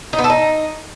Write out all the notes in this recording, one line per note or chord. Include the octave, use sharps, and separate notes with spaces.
D#4
B3
A4
D#4